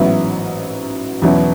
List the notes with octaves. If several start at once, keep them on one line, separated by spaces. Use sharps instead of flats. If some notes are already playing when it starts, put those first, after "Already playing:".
Already playing: A1 G#2 F#3 B3 E4
E2 B2 F#3 C#4 E4